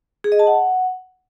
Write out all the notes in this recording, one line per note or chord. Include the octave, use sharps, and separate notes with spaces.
G#4
D#5
A5
F#5